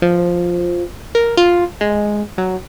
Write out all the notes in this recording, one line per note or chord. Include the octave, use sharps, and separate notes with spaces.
F3
A#4
F4
G#3
F#3